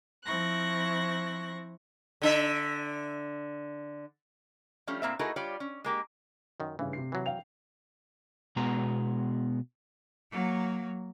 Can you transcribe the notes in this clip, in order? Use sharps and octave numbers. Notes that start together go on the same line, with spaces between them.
F3 C4 E4 C#6 F#6 A#6
D3 D4 E5
F3 G3 A3 C#4
A2 A#3 C4 E5
A3 D#4 E4 F#4 G#4 A#4
G3 F4 C#5 D5
C#4
G#3 A#3 G4
F#2 D#3
G2 C#3 E3
C3 C7
E3 F#3
F5 G5 F7
B2 G#3 B3 F#4 A#5
F#3 A#3